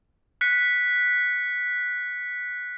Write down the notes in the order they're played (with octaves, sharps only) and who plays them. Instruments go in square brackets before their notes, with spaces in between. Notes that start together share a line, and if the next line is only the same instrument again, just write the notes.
[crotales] F#6 B6 C#7